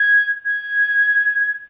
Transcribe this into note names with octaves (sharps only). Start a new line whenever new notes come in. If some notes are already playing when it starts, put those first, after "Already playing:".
Already playing: G#6
G#6